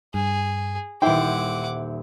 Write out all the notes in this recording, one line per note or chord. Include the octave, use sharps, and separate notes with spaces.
G2 G#4
D#1 D#4 E4 C5 F#5 G5 D6